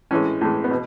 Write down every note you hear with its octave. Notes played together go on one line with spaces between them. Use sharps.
A2 E3 G#3 C#4
A2 E3 G#3
B3
B2